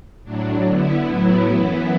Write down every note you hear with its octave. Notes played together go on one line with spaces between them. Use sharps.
A2 F#3 D4
D3 B3 E4
A2 F#3 B3 E4
F#2 E3 B3 E4